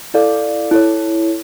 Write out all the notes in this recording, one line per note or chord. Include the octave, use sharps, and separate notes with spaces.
E4 A4 D5 F5
E4 A4 C#5